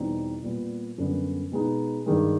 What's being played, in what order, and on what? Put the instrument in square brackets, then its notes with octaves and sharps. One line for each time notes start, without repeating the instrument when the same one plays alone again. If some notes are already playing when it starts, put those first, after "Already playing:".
Already playing: [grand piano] E2 B2 G3 C4 D#4
A#2 G3 B3
F#2 D3 G3 B3
B2 G#3 B3 D#4
G2 D#3 G#3